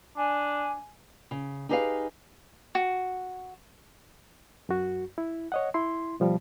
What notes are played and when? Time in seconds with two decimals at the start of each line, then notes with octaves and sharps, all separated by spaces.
0.17 D4 G#5
1.31 C#3
1.69 D#4 G4 G#4 B4 D#5 F5
2.75 F#4
4.69 F#2 F#4
5.18 E4
5.52 C#5 D#5 F#5
5.74 E4 C6
6.20 B2 F3 G3